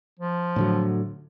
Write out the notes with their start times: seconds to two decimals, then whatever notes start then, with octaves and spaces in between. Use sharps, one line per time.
0.19 F3
0.56 A2 D3 F#3